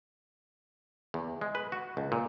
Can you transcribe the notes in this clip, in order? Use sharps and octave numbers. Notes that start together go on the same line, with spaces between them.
E2
G#3
B4
F#4
C#2
A#2